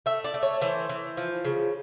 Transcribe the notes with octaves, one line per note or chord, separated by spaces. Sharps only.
A3 E5
D5
A3
C#5
E3 C5
E3
F3
C#3